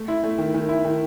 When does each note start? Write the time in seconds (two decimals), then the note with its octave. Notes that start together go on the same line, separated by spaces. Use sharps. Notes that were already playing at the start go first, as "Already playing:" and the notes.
Already playing: A3
0.08 E4
0.24 A3
0.38 D#3
0.54 D#3
0.69 E4
0.85 D#3